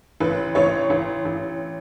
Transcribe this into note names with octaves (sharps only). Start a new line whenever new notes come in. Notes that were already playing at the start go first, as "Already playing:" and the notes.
A1 B4
A1 C#5
A1
A1